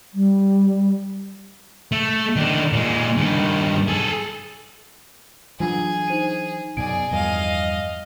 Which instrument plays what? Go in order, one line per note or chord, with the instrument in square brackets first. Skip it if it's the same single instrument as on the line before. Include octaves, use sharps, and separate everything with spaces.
[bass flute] G3
[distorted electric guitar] A3
D#3 D4
A#2 G#3
G2 D#3
G#4 A4
[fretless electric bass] E3 F#3 D4 [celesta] F4 [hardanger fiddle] G#4
[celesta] D#4 C5 D#7
[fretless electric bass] F#2 B2 [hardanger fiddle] G#4 D5 [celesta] G#5 D7
[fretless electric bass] E2 G2 F3 [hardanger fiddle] D#5 F5